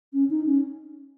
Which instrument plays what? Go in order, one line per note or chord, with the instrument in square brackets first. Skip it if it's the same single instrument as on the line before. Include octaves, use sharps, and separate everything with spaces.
[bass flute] C#4
D#4
C#4